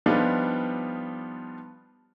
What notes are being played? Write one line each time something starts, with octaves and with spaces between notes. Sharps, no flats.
F3 G3 B3 D4 D#4 F4